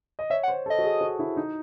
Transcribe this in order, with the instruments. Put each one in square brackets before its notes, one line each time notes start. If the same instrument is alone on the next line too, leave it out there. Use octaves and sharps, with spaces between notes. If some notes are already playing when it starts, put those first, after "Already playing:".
[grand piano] D#5
[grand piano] C#5 [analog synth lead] E5
[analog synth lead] F#5
[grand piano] C5
[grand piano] A4 [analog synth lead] D#5
[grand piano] F#4
G#4
F#4
E4
D#4